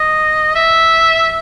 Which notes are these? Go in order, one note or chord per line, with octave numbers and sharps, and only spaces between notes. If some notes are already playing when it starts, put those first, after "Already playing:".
Already playing: D#5
E5